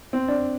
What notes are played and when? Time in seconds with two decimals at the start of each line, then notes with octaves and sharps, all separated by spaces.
0.13 C4
0.28 D4